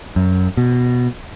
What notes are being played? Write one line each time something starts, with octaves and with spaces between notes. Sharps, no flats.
F#2
B2